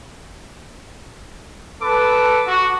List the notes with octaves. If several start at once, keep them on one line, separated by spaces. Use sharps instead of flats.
A4 B4 D6
F#4